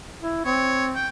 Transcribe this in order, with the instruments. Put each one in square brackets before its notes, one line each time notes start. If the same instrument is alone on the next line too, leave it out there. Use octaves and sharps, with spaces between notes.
[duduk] E4
[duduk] C4 [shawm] C#5
[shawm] G5